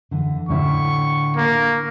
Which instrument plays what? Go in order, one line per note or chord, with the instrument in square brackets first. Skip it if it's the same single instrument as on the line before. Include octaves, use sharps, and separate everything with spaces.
[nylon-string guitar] D3 E3
[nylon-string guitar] A2 D3 E4 [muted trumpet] C#6
[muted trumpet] A#3